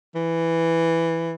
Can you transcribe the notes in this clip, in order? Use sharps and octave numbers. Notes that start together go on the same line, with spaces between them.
E3